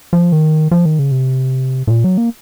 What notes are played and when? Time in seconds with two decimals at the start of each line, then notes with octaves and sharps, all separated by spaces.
0.13 F3
0.32 D#3
0.71 F3
0.86 D#3
0.99 C#3
1.11 C3
1.87 A2
1.91 A#2
2.04 F#3
2.18 A#3